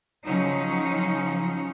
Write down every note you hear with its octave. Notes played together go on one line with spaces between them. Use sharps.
C#3 F3 F#3 C#4 D#4